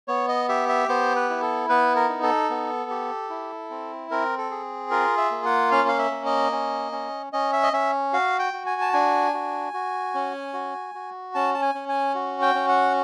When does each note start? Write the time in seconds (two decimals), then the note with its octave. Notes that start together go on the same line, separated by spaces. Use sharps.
0.08 B3 C#5
0.28 D#5
0.49 G4 E5
0.69 E5
0.88 B3 C5
1.16 B4
1.29 E4
1.42 A4
1.69 B3 B4
1.96 A#4
2.09 D#4
2.23 A4
2.50 B3
2.91 G4
3.30 E4
3.70 C4
4.11 C4 A#4
4.38 A4
4.51 G#4
4.91 F4 A#4
5.17 E5
5.31 A#3
5.45 F#5
5.71 C#4 F5
5.88 F5
5.98 E5
6.11 A#3
6.26 D#5
6.52 C#4
6.92 C#4
7.33 C#4 D#5
7.53 E5
7.63 D#5
7.73 C#4 E5
8.13 F#4 F5
8.39 G5
8.53 F#4
8.66 G#5
8.81 A5
8.93 D4 G#5
9.34 F#4
9.74 F#4
10.14 C#4
10.54 F#4
10.95 F#4
11.34 C#4 A5
11.54 A5
11.62 G#5
11.75 C#4
11.89 G#5
12.15 F#4
12.42 G5
12.55 C#4
12.68 F#5